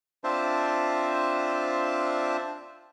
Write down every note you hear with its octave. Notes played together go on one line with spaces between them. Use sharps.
C4 D4 F4 C5 E5 A5